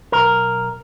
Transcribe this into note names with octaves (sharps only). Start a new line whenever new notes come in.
B1 A#4